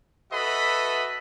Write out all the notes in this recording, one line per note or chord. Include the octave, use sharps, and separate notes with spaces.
F#4 A4 B4 D#5 E5 B5